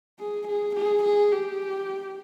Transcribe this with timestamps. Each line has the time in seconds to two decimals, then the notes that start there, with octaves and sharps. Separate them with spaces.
0.19 G#4
0.48 G#4
0.75 G#4
1.03 G#4
1.31 G4